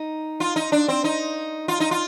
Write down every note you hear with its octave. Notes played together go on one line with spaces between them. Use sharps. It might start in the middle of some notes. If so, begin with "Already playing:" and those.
Already playing: D#4
F4
D#4
D4
C4
D#4
F4
D#4
F4